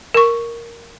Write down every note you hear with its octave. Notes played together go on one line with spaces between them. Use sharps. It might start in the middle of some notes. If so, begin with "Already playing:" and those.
A#4 C#6